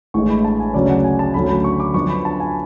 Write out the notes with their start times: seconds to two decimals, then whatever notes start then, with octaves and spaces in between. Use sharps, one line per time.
0.14 A1 A2 G#3 D4 C#6
0.30 B5
0.45 A5
0.60 G#5
0.74 D2 C#3 F#3 C#4 D5
0.89 F#5
1.04 G#5
1.19 A5
1.34 D2 D3 F#3 C#4 B5
1.49 B5
1.64 C#6
1.80 D6
1.94 F#2 F3 B3 D4 C#6
2.09 B5
2.25 A5
2.40 G#5